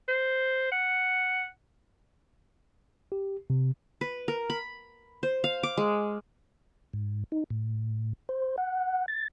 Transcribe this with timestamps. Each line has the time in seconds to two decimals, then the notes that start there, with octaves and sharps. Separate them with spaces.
0.09 C5
0.72 F#5
3.12 G4
3.50 C3
4.01 B4
4.28 A#4
4.50 B5
5.23 C5
5.44 F5
5.63 D6
5.77 G#3
6.93 G#2
7.32 D#4
7.50 A2
8.29 C5
8.58 F#5
9.08 A6